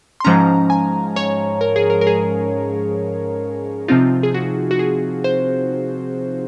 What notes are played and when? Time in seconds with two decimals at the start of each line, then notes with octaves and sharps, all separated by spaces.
0.20 C6
0.24 G#2 F3 G#3 C#4 A#5
0.70 G#5
1.16 C#5
1.61 A#4
1.76 G#4
1.90 A#4
2.01 A#4
2.07 G#4
3.88 C3 F3 C4 D#4 F4
4.23 G#4
4.34 F#4
4.71 F#4
4.79 G#4
5.24 C5